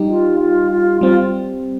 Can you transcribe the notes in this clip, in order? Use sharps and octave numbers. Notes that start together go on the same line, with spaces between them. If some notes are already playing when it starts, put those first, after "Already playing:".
Already playing: G3 D#4 G4
F4
F4
F4
G3 C4 F4